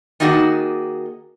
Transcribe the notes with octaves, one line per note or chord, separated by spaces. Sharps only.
D#3 A#3 D#4 F#4 G#4